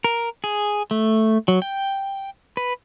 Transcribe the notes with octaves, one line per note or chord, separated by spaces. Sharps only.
A#4
G#4
A3
F#3
G5
B4